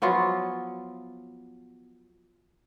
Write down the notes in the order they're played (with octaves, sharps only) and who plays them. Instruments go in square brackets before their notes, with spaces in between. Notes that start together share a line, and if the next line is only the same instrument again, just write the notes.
[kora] F3 F#3 B3 F4